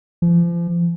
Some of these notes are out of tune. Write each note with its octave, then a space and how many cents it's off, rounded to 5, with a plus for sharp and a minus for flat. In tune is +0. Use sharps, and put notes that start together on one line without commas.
F3 -35